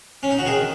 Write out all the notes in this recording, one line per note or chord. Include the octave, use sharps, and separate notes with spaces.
C#4
D#4
F#4
D#3 G#4